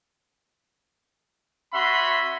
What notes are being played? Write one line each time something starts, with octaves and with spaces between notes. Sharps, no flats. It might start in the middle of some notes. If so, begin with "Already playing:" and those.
C#4 F#4 E5 F#5 B5 C6